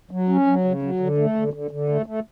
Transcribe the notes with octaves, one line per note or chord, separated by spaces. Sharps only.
F#3
C#4
F#3
C#3
F#3
D3
A3
D3
D3
D3
A3
A3